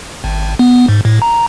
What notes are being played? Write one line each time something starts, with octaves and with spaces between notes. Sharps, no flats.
G#1
B3
G#2
A2
A#5